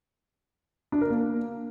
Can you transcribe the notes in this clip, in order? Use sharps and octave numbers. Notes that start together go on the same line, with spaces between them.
D4
A#4
A#3